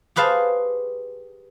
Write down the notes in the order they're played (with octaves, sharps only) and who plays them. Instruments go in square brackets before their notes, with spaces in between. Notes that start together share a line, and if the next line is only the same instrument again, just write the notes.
[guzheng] G4 G#4 B4 C5 F5 A5